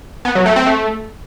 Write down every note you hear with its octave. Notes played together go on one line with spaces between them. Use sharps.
B3
F#3
A3
C4
A3